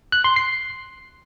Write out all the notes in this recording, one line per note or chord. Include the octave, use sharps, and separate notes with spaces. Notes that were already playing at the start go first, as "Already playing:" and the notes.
F#6
C6
C7